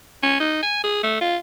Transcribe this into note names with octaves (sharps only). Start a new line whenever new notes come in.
C#4
D#4
G#5
G#4
A3
F4